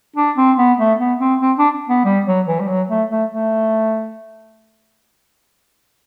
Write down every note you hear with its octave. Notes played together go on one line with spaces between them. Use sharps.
D4
C4
B3
A3
B3
C4
C4
D4
B3
G3
F#3
E3
G3
F#3
A3
A3
A3